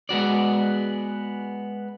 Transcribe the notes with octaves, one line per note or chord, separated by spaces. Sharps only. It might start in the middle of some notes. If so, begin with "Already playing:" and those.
G#3 B3 F#4 D5